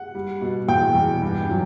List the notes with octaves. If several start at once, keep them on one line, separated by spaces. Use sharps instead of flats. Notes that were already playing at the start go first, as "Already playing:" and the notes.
Already playing: F#5
G3
B2
E2 G5
E2
G2
F#3